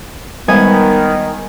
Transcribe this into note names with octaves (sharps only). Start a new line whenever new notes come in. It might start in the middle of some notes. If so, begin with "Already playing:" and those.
D#3 G3 G#3 B3 C5 G#5